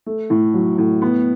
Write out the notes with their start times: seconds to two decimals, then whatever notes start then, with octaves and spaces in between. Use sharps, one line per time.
0.06 A3
0.30 A2
0.54 F#3
0.78 A2
1.02 B3